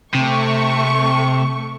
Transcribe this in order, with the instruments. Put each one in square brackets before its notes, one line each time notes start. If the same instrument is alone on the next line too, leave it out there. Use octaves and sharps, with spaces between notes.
[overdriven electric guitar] C3 [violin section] A3 C#6